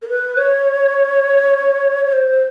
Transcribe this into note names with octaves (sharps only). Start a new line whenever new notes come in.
A#4
B4
C#5
C#5
C5